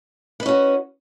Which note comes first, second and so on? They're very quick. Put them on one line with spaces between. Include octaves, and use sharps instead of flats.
B4 D#5 C#4 F#4